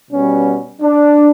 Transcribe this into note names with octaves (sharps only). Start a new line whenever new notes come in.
B2 G3 B3 C#4
D4